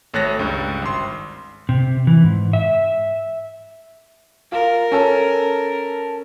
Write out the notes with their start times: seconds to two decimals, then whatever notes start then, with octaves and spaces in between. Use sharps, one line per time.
0.14 G#1 A3 C#5 F#6 A6 A#6
0.39 C#2 G2
0.82 G#1 C6
1.69 C3
2.07 E3
2.24 G#2
2.53 E5
4.52 F4 A#4
4.92 C#4 A4